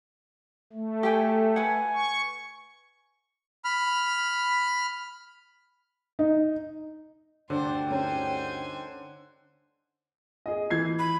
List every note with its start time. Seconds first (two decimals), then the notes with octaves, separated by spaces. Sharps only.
0.73 A3
1.03 G4 G5 G#5
1.56 B4 F#5 G#5
1.93 C#6
3.65 B5 F6
6.19 D#4
7.50 D2 G2 D3 D4 C5 D5 G5
7.91 C#4 D#4 A#4 C5 G#5
10.46 G#4 D#5
10.70 E3 G#6 C7
10.99 B5